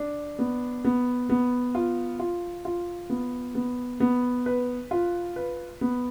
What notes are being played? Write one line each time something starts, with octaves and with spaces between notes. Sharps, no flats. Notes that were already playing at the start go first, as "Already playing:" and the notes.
Already playing: D4
B3
B3
B3
F4
F4
F4
B3
B3
B3
B4
F4
B4
B3